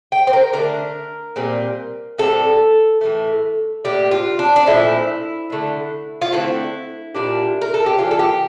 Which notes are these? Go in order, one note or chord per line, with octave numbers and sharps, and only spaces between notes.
G5
C5
A#4
D3 A3 D4 A#4
A#2 G3 C4
A2 G3 C4 A4
A2 E3 A3
A2 G3 A#3 D4 G4
F4
D4
D4
A#2 F3 A3 D4 E4
D3 A3 D4
F4
D3 A3 C4 E4
A#2 G3 D4
A#4
A4
G4
E3 A#3 D4 F4
A4
G4